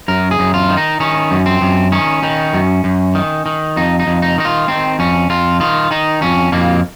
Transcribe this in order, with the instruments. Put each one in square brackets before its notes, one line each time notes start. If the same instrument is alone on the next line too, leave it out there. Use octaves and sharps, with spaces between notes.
[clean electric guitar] F#2 A#4
G#4
F#2
F4
D#3
D#4
D#3 C#4
F#2
C4
F#2
D#3 C#4
D#3
F#2
F#2
D#3
D#3
F2 D#4
D#4
F2
D#4
D#3 D#4
F4
D#3 C4
F2 C#4
F2 F4
D#3 F4
D#3 D#4
F2 C#4
F2 A#3